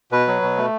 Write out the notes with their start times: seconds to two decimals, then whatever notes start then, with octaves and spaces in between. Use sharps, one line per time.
0.12 B2 B4
0.28 F#3
0.42 B2
0.57 A3